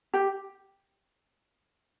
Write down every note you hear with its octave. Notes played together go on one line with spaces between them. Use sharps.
G4